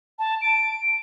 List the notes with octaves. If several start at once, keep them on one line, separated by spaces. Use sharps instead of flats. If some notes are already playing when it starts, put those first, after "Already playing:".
A5
D7